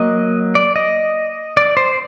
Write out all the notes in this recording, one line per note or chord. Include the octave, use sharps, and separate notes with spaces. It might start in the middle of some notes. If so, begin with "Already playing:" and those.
Already playing: F#3 A#3 D#5
D5
D#5
D5
C5